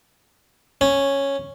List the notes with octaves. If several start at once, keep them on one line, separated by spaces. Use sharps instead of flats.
C#4